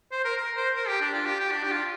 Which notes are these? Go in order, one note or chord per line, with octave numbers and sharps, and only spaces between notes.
C5
A#4
A#4
C5
A#4
G4
D4
F4
G4
G4
D4
G4
F4